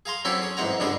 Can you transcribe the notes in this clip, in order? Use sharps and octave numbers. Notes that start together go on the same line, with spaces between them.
G#4 F5 A#5 C6
F#3 C4 C#4 E4 A4 D5
C#4 G#4
A1 G#2 C4 F#5 A#5
C#2 G2 D3 D4 G#4 D#5